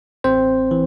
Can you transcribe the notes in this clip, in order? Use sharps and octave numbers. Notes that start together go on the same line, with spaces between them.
A1 C4 C5
E3